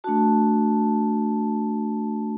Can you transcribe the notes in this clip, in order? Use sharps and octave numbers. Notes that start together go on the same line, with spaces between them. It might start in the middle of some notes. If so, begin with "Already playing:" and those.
A3 D4 F#4 A5